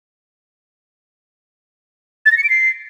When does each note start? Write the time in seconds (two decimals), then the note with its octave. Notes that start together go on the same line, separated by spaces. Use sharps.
2.26 A6
2.32 A#6
2.38 C#7
2.44 D7
2.50 C7